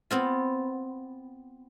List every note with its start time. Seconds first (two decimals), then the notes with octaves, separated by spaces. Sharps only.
0.11 B3 C4 F4